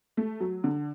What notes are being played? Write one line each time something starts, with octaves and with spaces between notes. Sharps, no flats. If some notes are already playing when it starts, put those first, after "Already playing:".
A3
F#3
D3